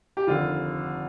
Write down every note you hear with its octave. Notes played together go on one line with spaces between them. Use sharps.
G4
F1 D#2 D3 F4